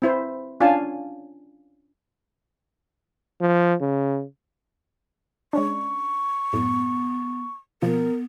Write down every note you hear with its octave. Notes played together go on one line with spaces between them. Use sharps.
C4 E4 C5
C#4 D4 F4 F5 G#5 A5
F3
C#3
G#3 C#4 D4 C#6
F#2 A2 B3
B2 F3 A#3 B3 A#4